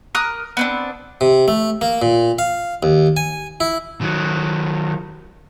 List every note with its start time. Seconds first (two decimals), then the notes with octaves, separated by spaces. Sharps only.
0.15 A#4 D#6 F6 F#6
0.57 B3 C4 D4
1.21 C3
1.48 A3
1.81 A#3
2.02 A#2
2.39 F5
2.83 D#2
3.17 G#5
3.60 E4
4.01 D#3 F#3